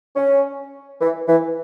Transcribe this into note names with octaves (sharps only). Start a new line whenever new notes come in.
C#4
E3
E3